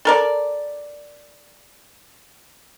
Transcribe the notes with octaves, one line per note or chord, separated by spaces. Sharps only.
A4 A#4 D5